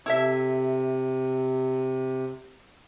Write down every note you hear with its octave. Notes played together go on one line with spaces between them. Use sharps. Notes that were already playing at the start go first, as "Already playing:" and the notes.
C3 E4 A4 E5